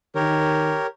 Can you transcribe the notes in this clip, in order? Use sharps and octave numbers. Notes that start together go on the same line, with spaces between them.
D#3 G4 A#4 C#5